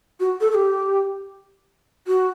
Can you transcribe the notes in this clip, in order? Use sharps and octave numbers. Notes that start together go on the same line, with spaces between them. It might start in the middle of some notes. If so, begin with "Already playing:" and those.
F#4
A4
A4
G4
F#4